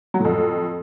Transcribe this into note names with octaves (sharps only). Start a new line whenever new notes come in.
F#3
A2
F2